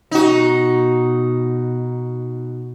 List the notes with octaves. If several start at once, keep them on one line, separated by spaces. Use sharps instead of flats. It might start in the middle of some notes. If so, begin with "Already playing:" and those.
B2 D#4 F#4